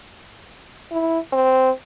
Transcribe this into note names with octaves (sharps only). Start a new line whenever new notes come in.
E4
C4